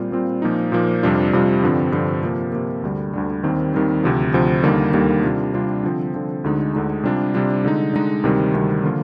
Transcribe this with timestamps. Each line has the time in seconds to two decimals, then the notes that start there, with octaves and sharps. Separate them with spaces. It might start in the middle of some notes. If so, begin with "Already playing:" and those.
Already playing: A#2 G3 C4 F4
0.12 A#2 G3 C4 F4
0.42 A#2 F3 A#3 D#4
0.72 A#2 F3 A#3 D#4
1.03 F2 C3 G3 D4 F4
1.33 F2 C3 G3 D4 F4
1.63 G2 D3 F3 C4
1.92 G2 D3 F3 C4
2.22 C3 F3 A#3
2.52 C3 F3 A#3
2.84 D2 D3 G3
3.13 D2 D3 G3
3.43 D#2 D#3 G3 C4
3.74 D#2 D#3 G3 C4
4.03 D2 C3 F3
4.33 D2 C3 F3
4.63 D#2 D3 G3 A#3 D#4
4.94 D#2 D3 G3 A#3 D#4
5.23 C3 G3 D4 F4
5.54 C3 G3 D4 F4
5.83 D3 F3 C4
6.14 D3 F3 C4
6.44 D2 D3 G#3 D#4
6.74 D2 D3 G#3 D#4
7.03 C3 G3 D4 F4
7.34 C3 G3 D4 F4
7.65 D3 G#3 D#4
7.93 D3 G#3 D#4
8.23 D2 C3 D#3 G3
8.54 D2 C3 D#3 G3
8.84 D3 F3 A#3 F4